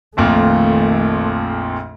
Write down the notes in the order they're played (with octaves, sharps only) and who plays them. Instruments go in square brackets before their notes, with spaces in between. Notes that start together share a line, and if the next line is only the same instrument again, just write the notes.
[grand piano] A#1 F2 A#2 [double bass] D#3 A3